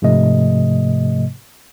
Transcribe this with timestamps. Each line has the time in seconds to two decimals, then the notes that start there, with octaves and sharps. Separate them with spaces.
0.02 G#2 C3 F3 A3 D#5